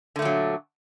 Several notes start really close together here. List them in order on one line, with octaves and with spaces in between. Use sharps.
D3 A3 A#2 F#3